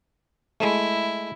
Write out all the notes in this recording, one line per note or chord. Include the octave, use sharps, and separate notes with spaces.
G#3 A3 E4